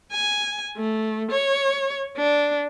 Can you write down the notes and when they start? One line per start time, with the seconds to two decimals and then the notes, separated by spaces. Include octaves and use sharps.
0.12 G#5
0.77 A3
1.31 C#5
2.17 D4